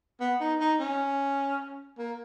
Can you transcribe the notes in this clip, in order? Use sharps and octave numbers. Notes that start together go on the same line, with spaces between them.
B3
D#4
D#4
C#4
A#3